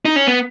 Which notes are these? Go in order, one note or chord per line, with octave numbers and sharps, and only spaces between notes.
D#4
C#4
B3